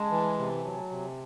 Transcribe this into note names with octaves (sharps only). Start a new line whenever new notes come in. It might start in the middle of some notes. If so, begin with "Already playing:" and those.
Already playing: G#3 G#5 A5
E3
C3
F#3
C3